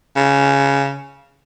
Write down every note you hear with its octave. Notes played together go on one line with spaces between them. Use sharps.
C#3